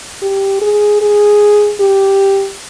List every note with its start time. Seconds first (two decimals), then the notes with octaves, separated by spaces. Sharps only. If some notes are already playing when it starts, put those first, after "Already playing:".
0.22 G4
0.61 G#4
1.01 G#4
1.80 G4